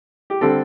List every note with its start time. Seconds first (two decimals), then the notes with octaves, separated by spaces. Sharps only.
0.30 G4
0.41 D3 G3 C4 A4